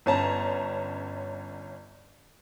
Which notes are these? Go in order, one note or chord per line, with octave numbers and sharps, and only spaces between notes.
G1 C#4 A5 A#5